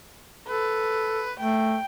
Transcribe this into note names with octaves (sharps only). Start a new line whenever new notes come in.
A4 B4
A3 G5